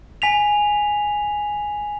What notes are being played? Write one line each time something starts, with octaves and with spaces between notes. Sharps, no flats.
G#5 B6 F7